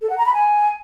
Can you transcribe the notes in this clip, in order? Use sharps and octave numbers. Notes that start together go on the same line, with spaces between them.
A4
F#5
A#5
B5
G#5